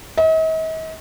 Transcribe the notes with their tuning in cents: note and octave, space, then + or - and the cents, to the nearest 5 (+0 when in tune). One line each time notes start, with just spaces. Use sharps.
D#5 +45